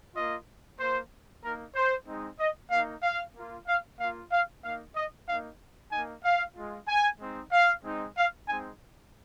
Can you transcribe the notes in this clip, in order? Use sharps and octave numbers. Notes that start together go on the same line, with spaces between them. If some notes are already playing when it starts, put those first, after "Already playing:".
A#3 F4 D#5
A#3 F4 C5
A#3 D#4 A#4
C5
G#3 C4 D#4
D#5
A#3 D#4 F5
F5
A#3 F4
F5
A#3 F4 F5
F5
A#3 D#4 F5
D#5
A#3 D#4 F5
A#3 D#4 G#5
F5
G#3 F4
G#5
G#3 C4 D#4
F5
G#3 C4 D#4
F5
G#3 C4 D#4 G#5